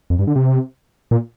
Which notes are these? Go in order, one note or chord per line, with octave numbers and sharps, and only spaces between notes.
F2
G2
D3
C3
A#2